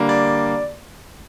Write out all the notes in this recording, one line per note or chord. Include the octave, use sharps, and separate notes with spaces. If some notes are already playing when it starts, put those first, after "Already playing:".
Already playing: D3 G3 A#3
D5